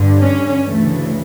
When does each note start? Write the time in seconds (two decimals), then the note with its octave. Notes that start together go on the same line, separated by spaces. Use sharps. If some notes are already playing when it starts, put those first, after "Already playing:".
Already playing: G2 D3
0.21 C#4
0.67 D2 C#3 E3 A3